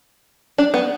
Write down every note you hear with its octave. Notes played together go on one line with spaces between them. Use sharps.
D4
B3